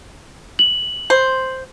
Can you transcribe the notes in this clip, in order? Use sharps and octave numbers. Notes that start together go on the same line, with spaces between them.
F#7
C5